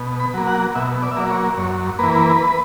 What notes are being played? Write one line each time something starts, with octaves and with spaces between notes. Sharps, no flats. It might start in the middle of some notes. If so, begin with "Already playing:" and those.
Already playing: B2
B5
F#3 A#3
F#5
B2 E5
D5
E5
F#3 A#3 D5
C#5
F#2 C#5
E3 A#3 B4